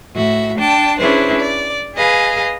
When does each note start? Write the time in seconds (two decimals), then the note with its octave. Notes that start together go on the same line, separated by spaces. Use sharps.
0.15 A2 F#4 E5
0.58 D4 G5 A5
1.00 C#4 D4 E4 G#4 B4 C5
1.40 D5
1.95 G#4 B4 D#5 F5 G#5